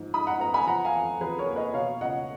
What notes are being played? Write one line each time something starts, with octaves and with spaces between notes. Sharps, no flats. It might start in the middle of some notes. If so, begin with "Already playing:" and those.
Already playing: G#2 F3
D#4 B5 D#6
F#5 A#5
B3 F#5 A#5
G#5 B5
F3 F#5 A#5
F5 G#5
F2
F2 G#4 B4
A#4 C#5
A#3
B4 D#5
B2 C#5 F5
C#2 D#5 F#5